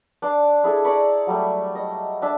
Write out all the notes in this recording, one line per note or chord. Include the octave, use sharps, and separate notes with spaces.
D4 F5 D6
E4 G#4 A4 G#5
D5 A#5 B5 C#6
F#3 G3 A3
D#5
D4 E5 G#5 A5